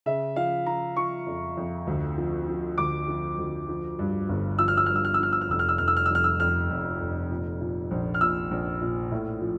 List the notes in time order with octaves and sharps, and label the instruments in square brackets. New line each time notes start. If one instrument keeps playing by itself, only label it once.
[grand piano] C#3 E5
F3 F5
F3 A#5
F3 C#6
F2
F2
D2
F3
F3
D2 D6
F3
D2
F3
G2
G1
F3 E6
F6
E6
G2 F6
E6
F6
E6
F3 F6
E6
F6
F1 E6
F6
E6
F1 F6
E6
F6
E6
F2 F6
E6
F2 F6
F1
F1
A#2
A#2
A#1
F6
A#2 E6
A#1
A#2
A2
F3